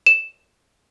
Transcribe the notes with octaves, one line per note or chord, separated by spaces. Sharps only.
E7